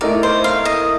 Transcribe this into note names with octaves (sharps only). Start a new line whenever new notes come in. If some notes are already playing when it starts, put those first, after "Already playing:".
A2 A3 D#4 A#4 D5
C5
F5
D#5